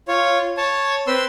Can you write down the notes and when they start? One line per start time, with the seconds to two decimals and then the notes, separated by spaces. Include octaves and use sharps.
0.08 F4 C#5
0.57 C#5 A5
1.07 C4 B4 C6 E6